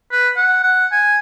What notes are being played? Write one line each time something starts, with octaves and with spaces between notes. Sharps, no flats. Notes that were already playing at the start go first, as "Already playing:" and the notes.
B4
F#5
F#5
G#5